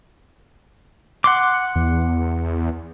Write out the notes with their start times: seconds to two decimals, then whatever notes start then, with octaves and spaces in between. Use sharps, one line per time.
1.24 F#5 C6 D6
1.76 E2